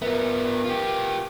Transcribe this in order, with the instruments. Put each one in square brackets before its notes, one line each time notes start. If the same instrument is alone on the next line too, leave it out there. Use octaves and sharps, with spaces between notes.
[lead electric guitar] B3 F4 [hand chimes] A#4 B4 E5
[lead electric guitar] F4 G4